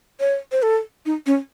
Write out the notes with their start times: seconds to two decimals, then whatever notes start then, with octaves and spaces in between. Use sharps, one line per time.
0.20 C#5
0.52 C5
0.62 A4
1.06 D#4
1.26 C#4